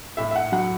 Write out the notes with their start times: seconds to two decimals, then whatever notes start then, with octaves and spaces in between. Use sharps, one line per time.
0.17 A2 E5
0.31 E5
0.36 F#5
0.52 F#3 F#5